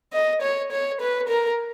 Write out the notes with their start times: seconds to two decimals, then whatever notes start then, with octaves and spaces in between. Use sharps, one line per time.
0.13 D#5
0.42 C#5
0.72 C#5
1.01 B4
1.29 A#4